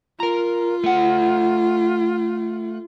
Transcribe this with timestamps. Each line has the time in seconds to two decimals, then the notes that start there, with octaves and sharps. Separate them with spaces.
0.20 F4 A#4 A#5
0.84 A3 F#5